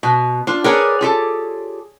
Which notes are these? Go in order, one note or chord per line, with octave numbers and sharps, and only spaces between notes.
B2
D4 F4
G#4 A#4 B4 C#5 D5 G5
F4 G4 A4